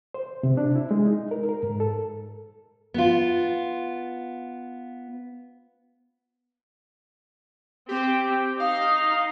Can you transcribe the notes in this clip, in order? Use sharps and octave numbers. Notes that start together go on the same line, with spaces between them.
C5
C3
D4
E4
G#3
D#4
A#4
A#4
G#2
A4
B3 F4
C4 G4
D#4 F5